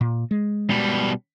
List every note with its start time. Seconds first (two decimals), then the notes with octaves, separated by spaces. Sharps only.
0.01 A#2
0.31 G#3
0.70 B2 G3